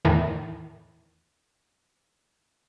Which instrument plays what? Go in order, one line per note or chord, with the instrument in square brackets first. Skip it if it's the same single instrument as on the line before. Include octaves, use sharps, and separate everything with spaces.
[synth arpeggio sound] E2 A2 D#3 E3